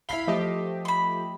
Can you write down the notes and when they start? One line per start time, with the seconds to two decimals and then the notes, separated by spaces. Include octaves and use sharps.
0.09 E4 F5 B5 C7 G7
0.27 F3 A3 G4 D#5 E5
0.85 B5 C6